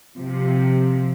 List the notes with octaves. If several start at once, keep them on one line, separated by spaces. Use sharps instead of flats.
C3 F3